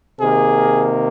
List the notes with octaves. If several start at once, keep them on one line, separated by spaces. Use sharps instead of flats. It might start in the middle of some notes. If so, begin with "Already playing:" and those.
C3 D#3 A#3 G#4